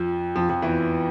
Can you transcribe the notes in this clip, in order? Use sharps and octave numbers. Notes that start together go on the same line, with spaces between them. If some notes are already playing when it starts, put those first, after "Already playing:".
Already playing: F2 F3
F2 F3
F2 F3
E2 E3